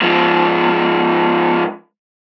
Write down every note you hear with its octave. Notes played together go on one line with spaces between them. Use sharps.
G#2 F3